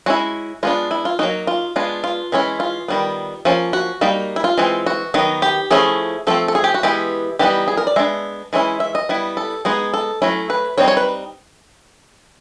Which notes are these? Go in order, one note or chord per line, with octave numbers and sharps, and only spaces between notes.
G#3 C#4 E4 F#4
G#3 B3 D4 F4
E4
F4
F#3 A#3 D#4 F#4
F4
G#3 B3 D4 F4
F4
E3 G#3 C#4 E4
F4
D#3 G3 B3
F3 A#3 C#4
F#4
G3 A#3 D#4
E4
F4
E3 G#3 C4
F#4
D#3 F#3 B3 D#4
G4
F3 A3 C#4 E4 G#4
F3 A3 C4 A4
A4
G#4
G4
F#4
E3 G#3 B3 E4 G4
E3 G3 B3 D#4 G4
G#4
A#4
D5
G#3 B3 D4 E5
E3 G#3 C#4 E4
E5
D#5
G3 B3 E4
A4
G#3 B3 D#4 G#4
A4
F#3 A3 C#4 E4
B4
G3 C4 D#4 C#5
C#5
B4